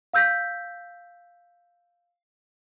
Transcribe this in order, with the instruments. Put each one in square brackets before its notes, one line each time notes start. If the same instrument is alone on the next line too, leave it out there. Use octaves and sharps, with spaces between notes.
[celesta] F5 E6 G6 A#6 B6